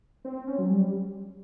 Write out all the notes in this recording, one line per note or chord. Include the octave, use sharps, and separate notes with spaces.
C4
C4
C#4
F#3
G3